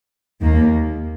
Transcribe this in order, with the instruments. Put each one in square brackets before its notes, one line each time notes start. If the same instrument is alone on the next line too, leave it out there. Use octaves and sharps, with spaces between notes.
[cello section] D#2 D#3 A#3